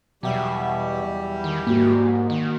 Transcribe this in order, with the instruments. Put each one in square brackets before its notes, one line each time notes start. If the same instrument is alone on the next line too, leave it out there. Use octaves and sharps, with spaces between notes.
[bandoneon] E2 G3 G4 [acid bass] B2 [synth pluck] F#3 E5
[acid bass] D#3
[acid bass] G#2 [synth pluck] A#3 F#4
[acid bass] D#3